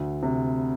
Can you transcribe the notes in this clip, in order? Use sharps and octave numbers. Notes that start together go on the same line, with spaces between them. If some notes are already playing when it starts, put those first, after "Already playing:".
Already playing: D2 D3
C3